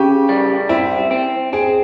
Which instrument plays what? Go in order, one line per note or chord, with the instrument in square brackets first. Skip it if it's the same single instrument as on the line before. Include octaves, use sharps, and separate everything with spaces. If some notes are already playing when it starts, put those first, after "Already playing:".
Already playing: [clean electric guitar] C#3 [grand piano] G4
[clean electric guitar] G3
[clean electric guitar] C4 [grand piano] E4
[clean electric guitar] C4
[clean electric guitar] C4 [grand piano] G#4